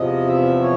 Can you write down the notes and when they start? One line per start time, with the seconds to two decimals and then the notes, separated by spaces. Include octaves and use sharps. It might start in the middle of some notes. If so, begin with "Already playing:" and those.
Already playing: E2 C3 F3 D#5
0.27 E5
0.61 C#5